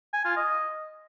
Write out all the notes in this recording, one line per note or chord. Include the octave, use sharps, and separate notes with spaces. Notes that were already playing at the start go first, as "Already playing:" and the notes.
G#5
F4
D#5